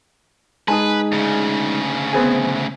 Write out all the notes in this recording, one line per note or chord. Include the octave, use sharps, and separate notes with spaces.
G#3 D#4 G#4 B4 G#5 A5
D2 C#3
B3 C4 G#4 G#5